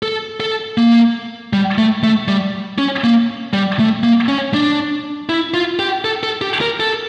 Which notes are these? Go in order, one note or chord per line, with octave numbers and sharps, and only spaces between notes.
A4
A4
A#3
G3
A3
A3
G3
C#4
A#3
G3
A3
A#3
C#4
D4
E4
F4
G4
A4
A4
G4
A#4
A4